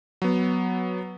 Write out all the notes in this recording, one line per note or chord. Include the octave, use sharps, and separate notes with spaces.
F#3 B3